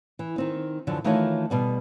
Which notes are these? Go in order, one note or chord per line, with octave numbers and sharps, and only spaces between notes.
E3
D#3 C4 D#4
F#2 D3 E3 F3
D#3 E3 A3 D#4 F4 C#5
B2 G3 B3